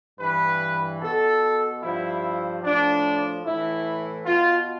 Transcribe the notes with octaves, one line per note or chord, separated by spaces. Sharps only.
G2 E3 B4
B2 A4
G2 F3 E4
A2 F3 D4
A2 E3 E4
B2 F4